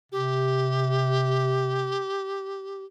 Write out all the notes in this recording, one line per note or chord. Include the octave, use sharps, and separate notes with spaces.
C3 G4